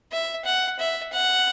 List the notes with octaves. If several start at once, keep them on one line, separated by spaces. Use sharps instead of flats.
E5
F#5
E5
F#5